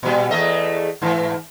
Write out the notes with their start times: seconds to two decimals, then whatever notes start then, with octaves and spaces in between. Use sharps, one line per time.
0.03 A#2 G3
0.31 E2 A3 D#5
1.02 G#2 E3